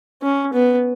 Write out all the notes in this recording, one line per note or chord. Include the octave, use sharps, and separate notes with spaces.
C#4
B3